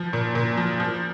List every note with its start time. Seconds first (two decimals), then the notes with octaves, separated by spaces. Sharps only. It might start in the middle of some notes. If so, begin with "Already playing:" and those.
Already playing: F3
0.13 A#2
0.35 A#2
0.57 F3
0.80 F3